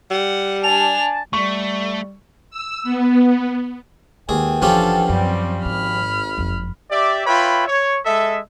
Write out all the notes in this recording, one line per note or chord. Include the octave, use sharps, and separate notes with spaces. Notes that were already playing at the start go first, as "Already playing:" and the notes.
G3 F#5
D4 G#5 A5 F7
G3 A3 C#6
E6
B3
D#2 G#3 G#4 B4 F#5 G5
F#1 E3 F3 C#4 D4 G4 A4
F#2 G3 C4
G#1 G#2 B5 F6
F#1 F2
G4 D5 E5
F4 B4 C#5 E5 G5 B5
C#5
G#3 A4 D#5 E5